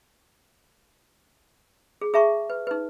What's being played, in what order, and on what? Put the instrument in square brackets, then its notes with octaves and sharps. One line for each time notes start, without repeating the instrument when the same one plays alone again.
[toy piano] G#4
G#4 E5 A5 C#6
B4
D#4 B4